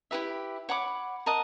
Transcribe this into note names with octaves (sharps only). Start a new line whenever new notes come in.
E4 G4 B4 E5
C#5 F#5 B5 D6
A#4 D#5 F#5 A5